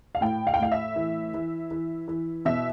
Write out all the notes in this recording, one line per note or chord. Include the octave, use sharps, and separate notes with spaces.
F5
A2 G5
F5
G5
A2 F5
E5
E3
E3
E3
E3
B2 E5